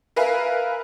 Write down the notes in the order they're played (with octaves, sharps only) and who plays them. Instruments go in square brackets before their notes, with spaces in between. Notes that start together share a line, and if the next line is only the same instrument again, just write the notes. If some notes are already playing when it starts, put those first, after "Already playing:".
[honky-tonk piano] A#4 B4 E5 F5 G#5